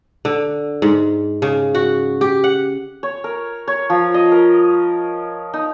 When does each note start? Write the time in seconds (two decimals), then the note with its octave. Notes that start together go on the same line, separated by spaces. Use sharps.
0.25 D3
0.82 G#2
1.42 C#3
1.75 F#4
2.21 G4
2.44 F#5
3.03 C#5
3.24 A#4
3.68 C#5
3.90 F3
4.14 D#5
4.32 A#4
5.54 D#4